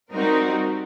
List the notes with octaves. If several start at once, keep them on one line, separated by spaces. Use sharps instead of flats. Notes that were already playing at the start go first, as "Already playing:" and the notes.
G3 C4 D#4 F#4 A#4